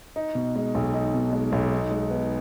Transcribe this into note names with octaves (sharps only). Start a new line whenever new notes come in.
D#4
B2
G#3
B1
D#4
B2
G#3
B1
D#4
G#3
B3